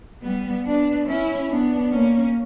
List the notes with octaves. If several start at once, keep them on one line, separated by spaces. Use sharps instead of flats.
G3 B3
B3 D4
C#4 E4
B3 D4
A#3 C#4